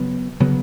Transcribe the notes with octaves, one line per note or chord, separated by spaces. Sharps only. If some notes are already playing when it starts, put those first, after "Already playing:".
Already playing: C#3 F#3 B3
C#3 F#3 B3